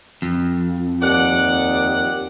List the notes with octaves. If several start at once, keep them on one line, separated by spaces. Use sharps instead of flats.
F2
D#2 D5 F#5